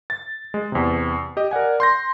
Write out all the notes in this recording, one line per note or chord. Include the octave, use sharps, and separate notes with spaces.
A6
G#3
E2 C3
G4 D#5
A#4 D5 F#5 G#5
C6 G6 A#6